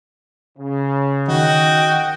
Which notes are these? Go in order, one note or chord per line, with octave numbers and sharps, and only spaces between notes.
C#3
D#3 F#4 D#5 G5